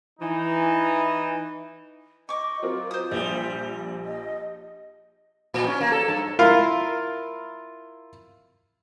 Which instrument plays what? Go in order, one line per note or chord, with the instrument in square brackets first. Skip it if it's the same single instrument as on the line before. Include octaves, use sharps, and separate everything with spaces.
[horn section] E3 D#4
[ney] D#5 [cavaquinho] C#6 D6
[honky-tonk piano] F#3 C4 A#4 [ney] F4
[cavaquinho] C5 D#6
[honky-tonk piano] A#1 F3 [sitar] G3
[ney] D#5
[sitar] A#2
C#4
A#3
A4
G2
[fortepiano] E4 F4 A#4 F5